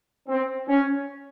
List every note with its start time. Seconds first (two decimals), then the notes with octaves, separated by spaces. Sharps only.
0.29 C4
0.68 C#4